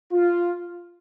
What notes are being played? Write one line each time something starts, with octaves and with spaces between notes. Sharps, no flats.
F4